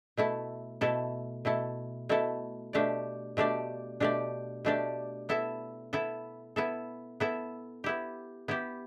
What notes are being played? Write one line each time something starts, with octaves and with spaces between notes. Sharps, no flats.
B2 A3 E4 A4
B2 A3 E4 A4
B2 A3 E4 A4
B2 A3 E4 A4
B2 A3 D4 G4 D5
B2 A3 D4 G4 D5
B2 A3 D4 G4 D5
B2 A3 D4 G4 D5
B3 E4 A4 E5
B3 E4 A4 E5
B3 E4 A4 E5
B3 E4 A4 E5
B3 E4 G4
B3 E4 G4